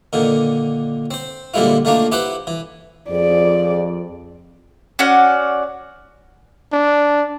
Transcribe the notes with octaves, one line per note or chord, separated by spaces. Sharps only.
A#2 D3 D#3
C4 C5
A#2 D3 G3 G#3 E4 F4
D#3 A3 A#3 D4 F4
E4 G4 B4 C5 F#5 G5
E3
F2 G#4 D5
C#4 F#4 D5 F#5
D4